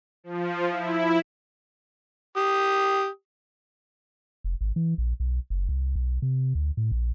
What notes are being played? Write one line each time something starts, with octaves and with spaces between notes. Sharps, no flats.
F3
E4
G4 D#6
F1
G#1
E3
A#1
B1
F#1
C2
B1
C3
D2
A2
A#1